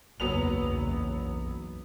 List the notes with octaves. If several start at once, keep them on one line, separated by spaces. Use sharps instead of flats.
F#1 B1 E2 F#3 B3 F7